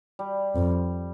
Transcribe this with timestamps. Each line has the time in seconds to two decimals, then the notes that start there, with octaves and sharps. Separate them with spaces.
0.19 G3
0.56 F2